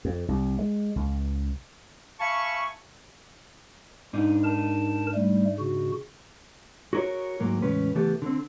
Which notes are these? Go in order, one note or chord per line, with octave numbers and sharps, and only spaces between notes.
F2
C2
G#3
C#2
E5 F5 G#5 A5 B5 C#6
G#2 D4 D#4
A#4 A5
G3 A3
C#3 F#4
F#4 G#4 A#4 B4 C#5
D2 G#2 F#3 A#3
E2 A2 C#3 G#3 C#4 B4
C#3 E3 A3 B3 G4 A4
D3 C4